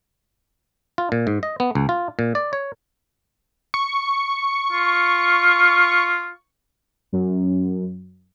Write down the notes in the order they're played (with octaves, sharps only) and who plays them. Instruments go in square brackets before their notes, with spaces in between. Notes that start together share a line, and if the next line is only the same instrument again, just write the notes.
[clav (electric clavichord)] F4
A#2
G#2
D#5
B3
C#2
F4
A#2
D5
C#5
[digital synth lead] C#6
[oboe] F4
[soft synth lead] F#2